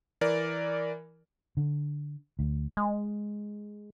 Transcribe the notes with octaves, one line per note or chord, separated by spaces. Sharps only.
E3 A#4 D5
D3
D2
G#3